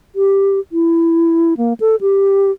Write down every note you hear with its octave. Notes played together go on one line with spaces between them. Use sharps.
G4
E4
A#3
A4
G4